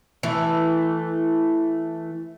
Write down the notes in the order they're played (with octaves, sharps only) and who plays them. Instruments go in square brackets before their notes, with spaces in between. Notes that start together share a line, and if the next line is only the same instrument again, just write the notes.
[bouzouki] E3 A3